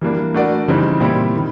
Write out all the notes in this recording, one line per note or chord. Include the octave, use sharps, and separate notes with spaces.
E3 G3 A#3 D4
A3 D4 F#4 A#4 D5
C#3 E3 G3 C4 D#4
A#2 G3 C4 E4 G4
D#3